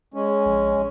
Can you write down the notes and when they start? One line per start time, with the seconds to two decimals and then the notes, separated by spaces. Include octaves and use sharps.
0.14 G#3 C#4
0.46 A#1